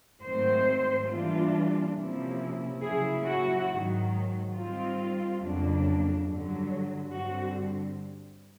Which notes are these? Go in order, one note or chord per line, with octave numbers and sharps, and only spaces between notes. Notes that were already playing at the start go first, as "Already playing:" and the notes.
G#2 D#3 F#3 A3 C4 C5
E3 G3 A#3 D4 F4
C3 F3 A#3 C#4 E4
C#3 F#3 A#3 C#4 E4 G#4
F#4
G#2 D#3 F#3
D#3 G3 C4 F4
F2 C#3 F#3 A#3 D4
G2 D3 F#3
G2 D3 G3 C4 F#4